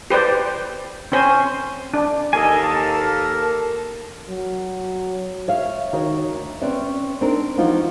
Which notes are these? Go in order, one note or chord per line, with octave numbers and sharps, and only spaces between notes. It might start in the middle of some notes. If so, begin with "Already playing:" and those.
G4 B4 C5 D5
C4 C#4 C5 G#5
D4
D#2 A#3 A4 D#5 G#5
A5
A#4
F#3
C#5 E5 F5
D#3 F#4 C#5
D2
C4 C#4 B4 D5 E5
C4 D4 D#4 A#4
E3 F3 D#4 F4 F#4